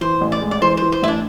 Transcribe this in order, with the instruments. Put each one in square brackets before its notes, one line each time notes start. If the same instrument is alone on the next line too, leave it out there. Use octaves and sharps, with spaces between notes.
[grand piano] E3 [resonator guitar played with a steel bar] C5
[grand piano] A1
[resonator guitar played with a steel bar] D5
[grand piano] G#3
[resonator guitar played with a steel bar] D5
[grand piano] E3 [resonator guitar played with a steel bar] C5
[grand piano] E3 [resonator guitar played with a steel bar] C5
[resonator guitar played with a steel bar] C5
[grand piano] A1 [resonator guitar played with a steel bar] E4
[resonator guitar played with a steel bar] D4